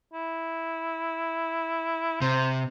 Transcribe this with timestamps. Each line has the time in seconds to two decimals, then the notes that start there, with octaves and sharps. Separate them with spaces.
0.13 E4
2.22 C3 C5